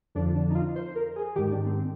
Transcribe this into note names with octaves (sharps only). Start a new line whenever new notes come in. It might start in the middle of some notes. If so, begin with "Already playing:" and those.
F2 D3 F3 D4
D4
D#4
F4
C5
A#4
G#4
G#2 D#3 G4
D4
C4